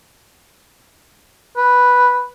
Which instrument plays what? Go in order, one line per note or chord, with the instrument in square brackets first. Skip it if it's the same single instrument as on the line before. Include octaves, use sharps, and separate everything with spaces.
[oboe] B4